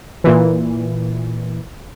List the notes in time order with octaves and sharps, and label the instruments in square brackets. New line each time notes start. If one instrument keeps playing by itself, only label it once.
[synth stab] A#2 E3